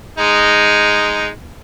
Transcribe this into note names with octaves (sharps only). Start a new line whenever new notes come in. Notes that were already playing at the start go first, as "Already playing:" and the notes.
G#3 D#4